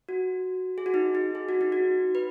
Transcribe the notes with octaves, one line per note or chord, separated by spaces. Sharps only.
F#4
G#4
F#4
D#4
D#4
G#4
F#4
D#4
F#4
B4